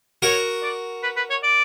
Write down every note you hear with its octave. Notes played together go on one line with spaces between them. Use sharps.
F#4 A#4 C#5
D5
B4
B4
C#5
D5